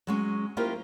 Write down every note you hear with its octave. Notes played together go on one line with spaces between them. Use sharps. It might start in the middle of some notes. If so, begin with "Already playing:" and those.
F#3 G#3 C#4
A#3 E4 F4 G4 A#4 C5